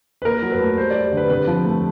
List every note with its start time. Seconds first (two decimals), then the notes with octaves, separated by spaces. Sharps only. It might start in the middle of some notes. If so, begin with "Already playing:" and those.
0.22 B4
0.25 A#2 A#4
0.42 F#3
0.52 B4
0.61 A3
0.78 G3 C5
0.91 D5
0.95 G3
1.12 D3
1.17 B4
1.30 C3 B4
1.47 F3
1.65 A3